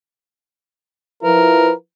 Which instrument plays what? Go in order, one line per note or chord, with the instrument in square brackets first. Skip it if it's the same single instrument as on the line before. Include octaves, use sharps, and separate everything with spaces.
[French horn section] F3 E4 B4 [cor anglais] A#4